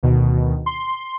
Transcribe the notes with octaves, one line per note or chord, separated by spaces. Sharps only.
D2 B2 D#3
C6